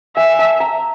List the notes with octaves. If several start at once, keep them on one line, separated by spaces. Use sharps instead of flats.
E5 G#5
A5
A#5